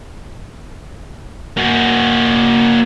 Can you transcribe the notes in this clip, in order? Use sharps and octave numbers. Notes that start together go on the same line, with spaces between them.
A#3 F#4